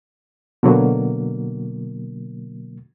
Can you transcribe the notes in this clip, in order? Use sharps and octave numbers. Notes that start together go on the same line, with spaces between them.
B2 D3 F#3 A#3